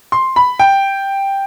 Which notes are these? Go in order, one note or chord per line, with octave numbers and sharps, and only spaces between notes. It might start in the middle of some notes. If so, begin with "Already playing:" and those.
C6
B5
G5